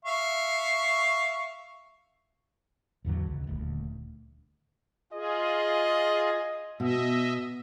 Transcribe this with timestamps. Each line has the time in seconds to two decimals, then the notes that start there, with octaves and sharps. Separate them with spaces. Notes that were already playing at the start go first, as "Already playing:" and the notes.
0.05 E5 F5 C#6
3.05 A1 E2 D3 F#3
3.27 C#2
3.47 D#1 D2
5.13 F4 G#4 D#5
6.80 B2 D#5 E5